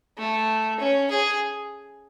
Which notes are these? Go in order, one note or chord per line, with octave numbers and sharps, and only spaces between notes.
A3
C#4
G#4